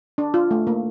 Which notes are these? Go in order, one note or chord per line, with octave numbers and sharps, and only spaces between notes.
D4
F4
A3
A#3